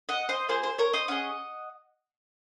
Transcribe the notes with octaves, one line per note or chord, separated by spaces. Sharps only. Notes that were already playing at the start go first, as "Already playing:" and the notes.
D#5 F#5
C5 D#5
A#3 F4 G#4 C5
C5
A#4 C#5
C5 D#5
C#4 F4 G#4 D#5 F#5